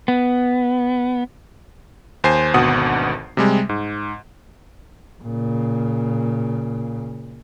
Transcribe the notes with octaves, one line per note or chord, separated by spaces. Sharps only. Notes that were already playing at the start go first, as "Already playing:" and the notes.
B3
D#2 C5 G#5 C7
G#1 D2 B2 F#5 D#6
C3 G3 G#3
G#2
A#2 C#3